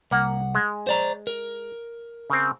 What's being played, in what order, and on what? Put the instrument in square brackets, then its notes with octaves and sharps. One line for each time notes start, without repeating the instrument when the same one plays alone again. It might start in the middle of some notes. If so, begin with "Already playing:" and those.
[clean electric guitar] C2 F#5 [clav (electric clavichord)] A#3
[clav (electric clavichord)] G#3
[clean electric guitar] C5 D5 A#5
A#4
[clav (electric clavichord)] C#3 C4